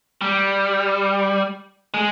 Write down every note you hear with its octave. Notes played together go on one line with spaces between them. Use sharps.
G3
G#3